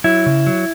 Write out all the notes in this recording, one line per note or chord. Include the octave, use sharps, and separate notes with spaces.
F#3 E4
C#3
F#3